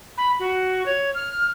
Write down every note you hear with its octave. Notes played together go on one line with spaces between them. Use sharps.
B5
F#4
C#5
F6